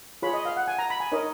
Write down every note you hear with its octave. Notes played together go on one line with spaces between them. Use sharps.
F4 G#4 C#5 B5
D#5
F5
F#5
G#5
A#5
B5
G#5
D#4 A#4 C#5 D#5